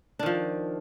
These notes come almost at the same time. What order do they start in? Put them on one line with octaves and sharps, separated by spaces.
D4 D#3 F3